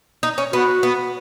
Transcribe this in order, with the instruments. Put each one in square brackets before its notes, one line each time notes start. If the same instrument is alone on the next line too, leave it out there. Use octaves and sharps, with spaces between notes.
[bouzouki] D#4
C#4
[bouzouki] B3 [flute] F#4
[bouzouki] B3